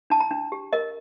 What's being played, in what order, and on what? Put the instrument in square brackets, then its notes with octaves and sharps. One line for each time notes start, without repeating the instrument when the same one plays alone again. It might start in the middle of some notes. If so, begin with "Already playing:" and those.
[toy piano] D4 A5
A#5
D4
G4
A#4 D#5